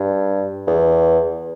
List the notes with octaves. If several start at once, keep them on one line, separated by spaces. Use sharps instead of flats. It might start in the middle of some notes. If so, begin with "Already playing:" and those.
Already playing: G2
E2